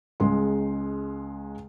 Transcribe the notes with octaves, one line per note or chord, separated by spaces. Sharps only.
C#2 G#3 C6